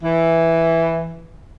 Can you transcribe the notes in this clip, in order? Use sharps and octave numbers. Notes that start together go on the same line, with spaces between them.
E3